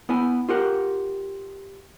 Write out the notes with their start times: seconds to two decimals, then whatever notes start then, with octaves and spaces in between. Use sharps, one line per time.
0.09 B3 E4 G#5
0.49 F4 G4 A#4 F#5